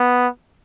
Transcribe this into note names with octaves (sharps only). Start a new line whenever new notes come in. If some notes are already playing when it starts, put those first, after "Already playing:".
Already playing: B3